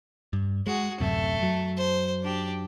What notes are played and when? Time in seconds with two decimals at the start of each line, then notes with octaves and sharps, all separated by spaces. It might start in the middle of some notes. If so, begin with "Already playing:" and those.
0.33 G2
0.67 G#3 F#4 G#4
1.00 D1 F#2 C3 A3
1.39 F#2 F#3
1.77 C5
2.23 D4 G4